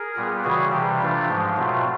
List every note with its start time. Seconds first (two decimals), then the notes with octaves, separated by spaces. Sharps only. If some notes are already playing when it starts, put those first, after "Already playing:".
Already playing: G#4 A#4
0.16 A#2 G3 B3
0.44 C#3 E3 G3 F#4 G#4
0.72 C3 E3 G3 G4
1.00 C3 E3 A3 D4 F4
1.28 G#2 F3 G#3
1.56 B2 F#3 A3 C4 F4